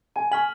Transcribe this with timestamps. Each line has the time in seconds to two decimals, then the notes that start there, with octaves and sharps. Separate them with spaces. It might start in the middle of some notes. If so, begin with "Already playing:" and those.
0.16 G#5 A5
0.31 G#5 C#6 F6 B6 F#7